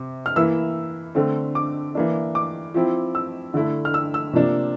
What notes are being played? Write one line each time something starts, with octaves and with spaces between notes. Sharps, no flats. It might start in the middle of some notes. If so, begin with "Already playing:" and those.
Already playing: C3
F6
E3 A#3 E4 E6
D3 A3 C4
D6
E3 A#3 D4
D6
F3 C4 E4
E6
D3 A3 E4
F6
E6
E6
C3 F3 A#3 D4